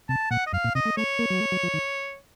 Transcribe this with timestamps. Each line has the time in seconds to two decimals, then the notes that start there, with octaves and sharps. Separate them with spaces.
0.09 C3 A5
0.31 A#2 F#5
0.47 D#5
0.52 F#2 F5
0.64 A#2
0.75 C3 D#5
0.85 A3
0.97 A3 C#5
1.19 A#3
1.30 F#3
1.41 A3
1.52 F#3
1.63 F3
1.74 D#3